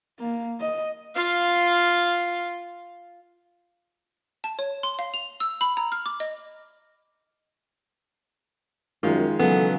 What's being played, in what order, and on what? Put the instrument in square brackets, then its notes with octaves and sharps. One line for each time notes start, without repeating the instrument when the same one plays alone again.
[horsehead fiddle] A#3
D#5
[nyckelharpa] F4 F5
[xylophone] A5
C#5
C6
F5
F7
E6
B5
A#5
F6
D6
D#5
[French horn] F#2 [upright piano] D#3 F3 G#3 [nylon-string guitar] F4
[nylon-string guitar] C#3 E3 F#3 [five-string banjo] B3 [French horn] A4